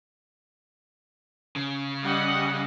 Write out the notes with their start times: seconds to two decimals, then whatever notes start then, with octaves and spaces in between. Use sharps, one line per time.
1.56 C#3
2.02 G3 D#5 F#5